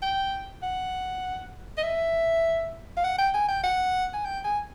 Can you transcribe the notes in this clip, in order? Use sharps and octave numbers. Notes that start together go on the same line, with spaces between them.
G5
F#5
D#5
E5
F5
F#5
G5
G#5
G5
F#5
G#5
G5
G#5